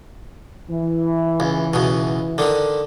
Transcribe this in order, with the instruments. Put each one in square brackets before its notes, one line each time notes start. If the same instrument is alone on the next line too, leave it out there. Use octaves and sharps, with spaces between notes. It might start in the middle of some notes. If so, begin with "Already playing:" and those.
[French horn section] E3
[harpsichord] C#2
C#2 B2
D3 D#3